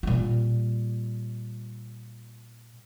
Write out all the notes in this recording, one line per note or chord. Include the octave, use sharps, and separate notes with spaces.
A#2 G3